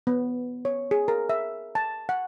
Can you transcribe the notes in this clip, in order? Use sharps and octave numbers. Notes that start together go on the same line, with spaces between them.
B3
C#5
G#4
A#4
E5
A5
F#5